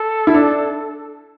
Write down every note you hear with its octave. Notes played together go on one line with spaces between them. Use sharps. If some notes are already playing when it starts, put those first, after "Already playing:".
Already playing: A4
E4
D4